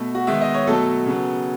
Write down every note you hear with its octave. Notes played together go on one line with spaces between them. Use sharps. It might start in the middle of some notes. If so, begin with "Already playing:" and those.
Already playing: B2 A3
F#4
D#3 G#3 B3 E5
D#5
C#5
B2 F#3 A3 A4
C#3 F#3 B3